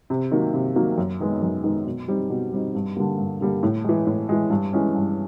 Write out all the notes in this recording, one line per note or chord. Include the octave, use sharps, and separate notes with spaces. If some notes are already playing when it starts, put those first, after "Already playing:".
C3
D#3 F#3 A#3
C3
D#3 F#3 A#3
F#2
D#3 G#3 B3 D#4
F#2
D#3 G#3 B3 D#4
B2
G3 C4 D#4
B2
G3 C4 D#4
G2
D3 G3 A#3
G2
D3 G3 A#3
A2
E3 G#3
A2
E3 G#3
G2
E3 G#3 C#4
G2